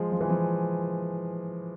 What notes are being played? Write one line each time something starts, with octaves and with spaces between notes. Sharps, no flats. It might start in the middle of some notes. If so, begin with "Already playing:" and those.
Already playing: F3 G#3
F3
E3
F3